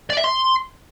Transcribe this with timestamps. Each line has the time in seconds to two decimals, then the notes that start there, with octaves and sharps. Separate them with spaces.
0.10 D5
0.17 E5
0.24 C6